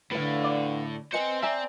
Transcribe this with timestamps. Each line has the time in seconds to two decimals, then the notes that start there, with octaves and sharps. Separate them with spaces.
0.11 A2 D3 B4 F5
0.44 D5
1.13 C4 B4 C5 D#5 G#5 C#7
1.42 C4 D5 E5 G#5 A#5